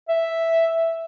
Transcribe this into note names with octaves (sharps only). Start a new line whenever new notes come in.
E5